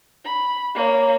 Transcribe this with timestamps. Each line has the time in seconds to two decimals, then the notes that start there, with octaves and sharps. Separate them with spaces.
0.24 B5
0.75 A#3 C#5